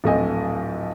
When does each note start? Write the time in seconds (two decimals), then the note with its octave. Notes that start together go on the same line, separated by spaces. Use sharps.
0.04 D1 A#1 A3 C4 D#5 G#5